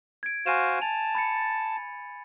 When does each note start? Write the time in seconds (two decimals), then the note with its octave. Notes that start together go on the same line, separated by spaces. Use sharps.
0.23 G#6 D7
0.46 F#4 C5 F5 G#5 D#7 E7
0.82 A5 F7
1.15 B5 A6 C#7